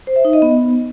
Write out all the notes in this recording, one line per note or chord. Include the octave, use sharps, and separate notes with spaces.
C5
E5
D#4
D#5
B3